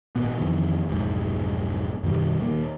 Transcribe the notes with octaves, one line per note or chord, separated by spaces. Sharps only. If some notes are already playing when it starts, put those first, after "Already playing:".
G#1 A#2 B3
F2 D#3 E3
F1 B1 G#2
F#2 B2 D#3 G3
D#1 D#3 A#3